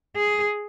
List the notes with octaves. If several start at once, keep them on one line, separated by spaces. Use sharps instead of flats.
G#4